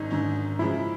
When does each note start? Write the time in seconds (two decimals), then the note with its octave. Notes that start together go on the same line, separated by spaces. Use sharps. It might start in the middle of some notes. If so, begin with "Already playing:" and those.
Already playing: G#1 F#2 D#4
0.11 G#1 F#2 D3
0.59 F#2 C#3 F3 G#3 E4